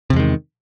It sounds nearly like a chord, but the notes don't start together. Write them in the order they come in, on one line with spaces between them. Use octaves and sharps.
C3 E2 G#3 D#3